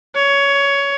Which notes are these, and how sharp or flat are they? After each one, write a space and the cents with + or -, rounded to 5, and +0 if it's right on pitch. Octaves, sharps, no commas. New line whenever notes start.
C#5 +15